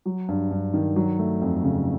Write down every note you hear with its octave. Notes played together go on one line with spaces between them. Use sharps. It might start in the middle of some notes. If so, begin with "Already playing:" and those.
F#3
G2
G2
D#3
F#3
A3
F2
C#3